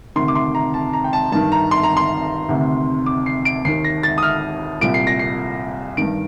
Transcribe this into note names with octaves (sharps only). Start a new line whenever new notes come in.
D2 C3 D#3 C6
D6
C6
A#5
A5
A#5
G5
A5
G2 D#3 A5
A#5
C6
A#5
C6
D2 C3 D#3
D6
C7
D7
D#2 D#3 C7
A#6
A6
D#6
F6
C2 A#2 D7
C7
A#6
C7
G2 D#3 D7